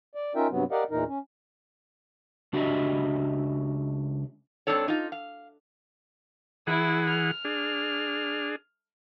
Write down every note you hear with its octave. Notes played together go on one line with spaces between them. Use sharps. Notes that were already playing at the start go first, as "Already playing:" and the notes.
D5
C#4 D#4 F4 A#4 E5 G5
G2 C3 F#3 B3
G4 A#4 D5 D#5 F5 F#5
E2 A#2 E3 D#4 A#4
C#4
C#2 D4 F#4 G4 D#5 E5
G#2 G#3 C4 D4 A4 C#5
D#4 F4
F5
E3 E4 G#4 F#5
F6
D4 G#4